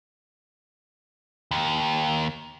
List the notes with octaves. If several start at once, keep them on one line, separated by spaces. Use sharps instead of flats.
D#2